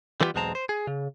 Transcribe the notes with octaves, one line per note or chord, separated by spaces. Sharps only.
D3 E3 G3 B3 F4 G4
B1 E2 G#3 C4 A5 A#5
C5
G#4
C#3